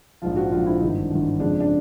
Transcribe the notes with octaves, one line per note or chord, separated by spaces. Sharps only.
A#1 G#2 F3 F4
F#4
A#1 G#2 F3 F4
E4
G#1 G2 E3 D#4
G#1 G2 E3
F2 C#3 F3 G#3 D4
D4